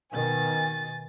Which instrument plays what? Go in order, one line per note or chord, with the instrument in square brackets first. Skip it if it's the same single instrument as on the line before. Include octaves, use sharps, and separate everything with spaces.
[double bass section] B2 D#3 [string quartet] G#5 A6